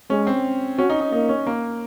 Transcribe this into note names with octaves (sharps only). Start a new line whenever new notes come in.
G#3 C#4
C4
C#4 F#4
D#4
D#4
A#3 D#4
C#4
A#3